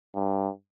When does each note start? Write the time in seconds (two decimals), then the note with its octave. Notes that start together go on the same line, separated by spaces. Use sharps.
0.15 G2